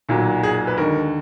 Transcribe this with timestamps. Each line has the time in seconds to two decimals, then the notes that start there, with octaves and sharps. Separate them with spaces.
0.09 B1 A#2 F#3
0.43 G#4
0.67 B4
0.77 D#2 D3 G#3 A#4